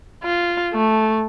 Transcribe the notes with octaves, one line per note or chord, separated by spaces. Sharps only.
F4
A3